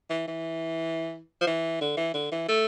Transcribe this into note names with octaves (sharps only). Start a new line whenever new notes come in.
E3
E3
F3
E3
D3
E3
D3
E3
A3